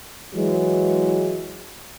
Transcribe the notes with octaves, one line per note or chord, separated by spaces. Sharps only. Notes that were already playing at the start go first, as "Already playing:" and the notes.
E3 F#3 G#3